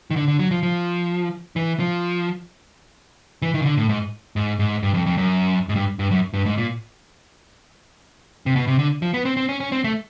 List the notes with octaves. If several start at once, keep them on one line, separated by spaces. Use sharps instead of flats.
D#3
D3
D3
F#3
F3
F3
E3
F3
E3
D#3
C#3
D3
A2
G#2
G#2
G#2
G2
F2
F2
F#2
G#2
G2
G2
F#2
G2
G#2
A#2
C3
B2
C3
D3
F3
B3
C4
C4
C#4
C#4
C4
A3